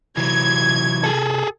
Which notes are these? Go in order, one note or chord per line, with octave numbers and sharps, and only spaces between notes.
C3 E3 F#3 G#6
G#4 A4